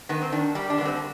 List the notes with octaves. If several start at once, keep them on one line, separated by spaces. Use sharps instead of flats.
D#3 B3
C4
D#3 D4
G3 G4
D4
D3 B3
C4